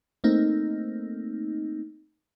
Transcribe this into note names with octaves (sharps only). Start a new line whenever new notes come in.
A3 A#3 C4 D#4